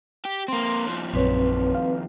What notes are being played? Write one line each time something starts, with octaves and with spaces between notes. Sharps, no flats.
G4
A#3 C4 C6
D#2 F3
A#1 F#2 C4 B4 C#5
F5